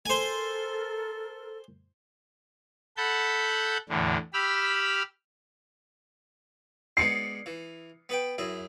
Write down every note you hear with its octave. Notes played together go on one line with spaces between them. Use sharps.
A4 A#4 C5 G#5
A4 F#5 A5 B5 G6
E2 A2 D3
G4 B5 E6 F6
G#3 B3 D4 C7 C#7
E3
B3 B4 G5
F#2 E4 G#4